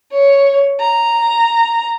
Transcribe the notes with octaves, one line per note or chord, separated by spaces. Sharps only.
C#5
A#5